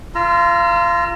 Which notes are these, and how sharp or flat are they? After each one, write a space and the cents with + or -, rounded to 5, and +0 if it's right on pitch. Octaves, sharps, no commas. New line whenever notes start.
F4 -25 A#5 +0 E6 +45